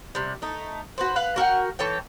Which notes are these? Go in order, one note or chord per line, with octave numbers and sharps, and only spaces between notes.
C3 G3
A3 D#4
F#4 B4 C5
B4 F5 F#5
F#4 A#4 F#5 G5
E3 A4 C#5 G5